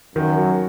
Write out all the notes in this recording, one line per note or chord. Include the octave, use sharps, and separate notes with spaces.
F#2 D#3
F#3